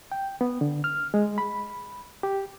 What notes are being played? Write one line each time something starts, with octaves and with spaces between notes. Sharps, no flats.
G5
B3
D3
F6
G#3
B5
G4